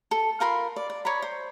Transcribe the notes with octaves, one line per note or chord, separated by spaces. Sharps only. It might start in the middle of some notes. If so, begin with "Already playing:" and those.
A4
F4 A#4 B5 C6
D5
D5
C#5 D5 A#5 B5
C5